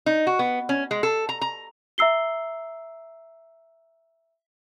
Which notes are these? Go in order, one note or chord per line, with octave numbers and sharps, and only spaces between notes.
D#4
F#4
B3
C#4
G#3
A4
A#5
A#5
E5 A#5 E6 C7 G7